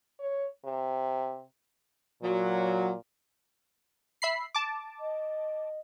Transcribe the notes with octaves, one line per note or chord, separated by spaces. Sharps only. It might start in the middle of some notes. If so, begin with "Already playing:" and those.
C#5
C3
A#2 F#3
E5 B5 C7
A5 D6
D#5